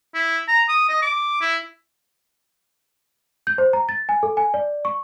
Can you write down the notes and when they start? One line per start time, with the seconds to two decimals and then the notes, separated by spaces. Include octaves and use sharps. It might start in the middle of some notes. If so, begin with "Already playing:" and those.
0.15 E4
0.48 A#5
0.69 D#6
0.89 D#5
1.02 D6
1.41 E4
3.47 G6
3.58 C5
3.73 A#5
3.89 A6
4.09 G#5
4.23 A4
4.37 G#5
4.54 D5
4.85 C#6